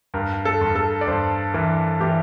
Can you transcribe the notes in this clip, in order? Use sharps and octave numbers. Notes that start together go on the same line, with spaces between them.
G2 A#4
A4
G2
A4
D5
G2 C5
E3 A#4
E3 G4